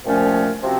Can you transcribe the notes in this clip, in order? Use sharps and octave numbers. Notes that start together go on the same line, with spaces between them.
C2 A#2 F3 A3 C#4
C3 F3 C4 F#4